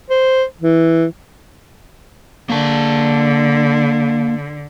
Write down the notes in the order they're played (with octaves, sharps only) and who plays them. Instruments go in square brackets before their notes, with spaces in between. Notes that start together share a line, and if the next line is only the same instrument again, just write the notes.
[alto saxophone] C5
E3
[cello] D3 [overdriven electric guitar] A#3 A5